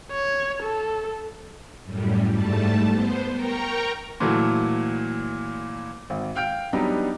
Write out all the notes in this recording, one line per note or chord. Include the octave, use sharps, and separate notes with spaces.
C#5
A4
F#2 A2 G3
G#2 G3 A3 A5
B3 C5
A#4 G5 A#5 C#6
A#2 E3 F#3 A3
G#1
F5 G5 F6 G6 D7
F#3 G3 B3 D4 D#4 G4